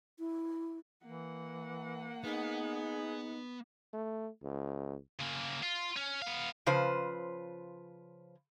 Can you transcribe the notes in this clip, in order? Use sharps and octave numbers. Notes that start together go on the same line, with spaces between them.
E4
E3 A#3 F#5
B3 D#4 G#4
A3
C#2
C#3 A#3
F4
C#4
B3 F5
C#3 F3 B4 C5